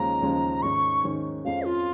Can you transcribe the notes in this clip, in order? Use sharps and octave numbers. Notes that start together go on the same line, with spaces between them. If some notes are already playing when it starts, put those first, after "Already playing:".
Already playing: D#2 C#3 F3 G#3 C#4 A#5
D#2 C#3 F3 G#3 C#4
G#2 D#3 C#4 C#6
G#2 D#3 C#4
F2 F3 G#3 C#4 F5
F4